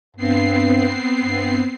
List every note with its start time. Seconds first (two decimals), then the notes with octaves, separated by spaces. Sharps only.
0.17 G2 B3 C4 C7
1.19 G2